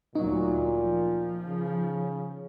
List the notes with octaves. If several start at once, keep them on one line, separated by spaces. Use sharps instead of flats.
D2 A#2 F#3 D#4
F3
C#3